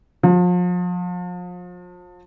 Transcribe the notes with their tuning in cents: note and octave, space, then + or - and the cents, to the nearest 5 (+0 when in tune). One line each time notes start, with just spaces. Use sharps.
F3 +35